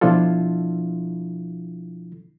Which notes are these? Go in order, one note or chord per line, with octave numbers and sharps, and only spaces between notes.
B2 F3 D4 E4 F4 A4